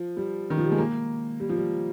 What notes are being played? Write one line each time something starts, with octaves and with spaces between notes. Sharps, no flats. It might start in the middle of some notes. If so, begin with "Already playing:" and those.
Already playing: F3
G3
D#3
F3
G3
G#3
A#3
G3
F3
G3